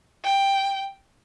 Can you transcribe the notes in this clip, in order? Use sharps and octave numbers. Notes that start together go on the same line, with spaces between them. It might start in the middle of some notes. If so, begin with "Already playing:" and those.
G5